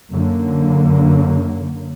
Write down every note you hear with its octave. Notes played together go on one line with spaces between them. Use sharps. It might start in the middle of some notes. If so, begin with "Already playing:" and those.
F#2 D3 A#3